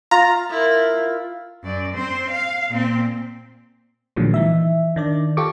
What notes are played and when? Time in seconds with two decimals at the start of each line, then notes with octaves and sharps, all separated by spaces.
0.11 F4 A#5
0.50 E4 A#4
1.63 F#2 D5
1.95 C4 C5
2.31 F5
2.70 A#2 C4
4.16 A#2 D3 D#3 F3 F#3 G#3
4.34 E3 D#4 E5
4.96 D#3 D4 D5
5.37 F4 G4 A4 C#6 D6